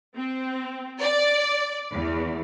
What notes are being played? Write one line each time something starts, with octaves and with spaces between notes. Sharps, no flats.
C4
D5
E2